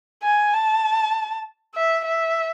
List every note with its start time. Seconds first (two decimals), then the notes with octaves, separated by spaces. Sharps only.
0.23 G#5
0.53 A5
1.75 E5
2.05 E5